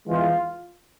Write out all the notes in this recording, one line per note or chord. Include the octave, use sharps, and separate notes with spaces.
E2 E3 G#3 F4